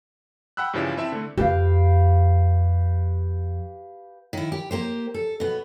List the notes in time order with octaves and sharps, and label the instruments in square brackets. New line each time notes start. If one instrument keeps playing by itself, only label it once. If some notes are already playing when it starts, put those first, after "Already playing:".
[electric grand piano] F#5 G5 B5 E6 F#6
G2 C#3 E3 F3 G3 E4
C4 E4 E5 A5
D3 A3
[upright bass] F2 [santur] G4 B4 F5
[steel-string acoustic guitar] D#3 E4
G4
A#3 G4 C5
A4
B2 B3